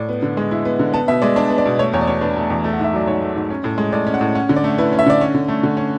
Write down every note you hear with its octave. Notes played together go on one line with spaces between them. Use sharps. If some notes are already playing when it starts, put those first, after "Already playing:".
Already playing: A2 D5
B3
D3
G#3
E4
B3
D3
B3 A5
B2 E5
G#3 D5
D4 D5
B3
D5
B2
A3 C#5
E2 C#5
D5
B2 C#5
D4 B4
A3
E2
A3
F#5
G#2
E5
F#3 D5
G#2 C#5
A3
G#2
C#4
A2
G#3
A2 D5
C#4
F#5
A2
C#4 F#5
D3
D5
A3
E4 B4
C#4
E5
D3 D5
C#4
D3
A3
D3
C#4